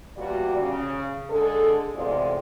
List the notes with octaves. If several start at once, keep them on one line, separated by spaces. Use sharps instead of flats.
E2 A#2 G3 F#4 D5
C#3
D3 G#3 G#4 A4
E2 A2 C3 G#3 F4 D5